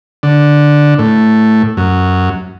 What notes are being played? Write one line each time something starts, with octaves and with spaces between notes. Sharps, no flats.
D3
A2
F#2